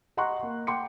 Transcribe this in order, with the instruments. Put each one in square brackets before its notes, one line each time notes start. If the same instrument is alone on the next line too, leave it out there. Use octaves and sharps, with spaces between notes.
[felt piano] D#5 F#5 A#5 C6 C#6 F#6
A#3
F#5 G5 C6 D6 C#7